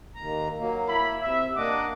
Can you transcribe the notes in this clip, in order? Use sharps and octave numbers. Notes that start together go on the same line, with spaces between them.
D#2 A#5
F#3 A#3
E4 B5
C3 E5
A#3 D4 D#5 F#5 D6